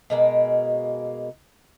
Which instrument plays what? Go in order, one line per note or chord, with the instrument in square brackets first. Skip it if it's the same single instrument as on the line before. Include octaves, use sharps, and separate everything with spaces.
[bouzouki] B2 G#3 A#3